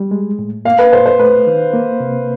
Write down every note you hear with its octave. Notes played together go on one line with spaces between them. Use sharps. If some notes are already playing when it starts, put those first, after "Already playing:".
Already playing: G3
G#3
A2
A#3 F5
B4
A#2 C5
C5
A3 B4
D#3
A#3
C3